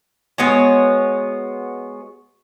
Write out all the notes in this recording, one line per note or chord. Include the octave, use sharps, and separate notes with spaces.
G#3 B3 F#4 C#5